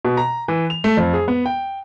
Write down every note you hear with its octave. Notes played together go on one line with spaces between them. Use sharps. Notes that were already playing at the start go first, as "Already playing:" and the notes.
B2
A#5
E3
F7
A3
F2
G#4
B3
G5